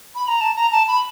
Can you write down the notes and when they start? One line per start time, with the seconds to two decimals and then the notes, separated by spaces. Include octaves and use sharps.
0.15 B5
0.28 A#5
0.41 A5
0.56 A#5
0.72 A5
0.88 B5